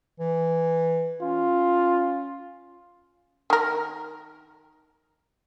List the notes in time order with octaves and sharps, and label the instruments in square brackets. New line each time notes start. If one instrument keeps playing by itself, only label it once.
[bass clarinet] E3
[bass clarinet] C#4 [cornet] F4
[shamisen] D#3 A#4